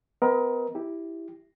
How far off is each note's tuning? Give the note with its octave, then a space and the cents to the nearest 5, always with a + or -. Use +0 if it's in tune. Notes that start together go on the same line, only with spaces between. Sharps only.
B3 +40 A#4 +25 D#5 +20
E4 +0 G4 +0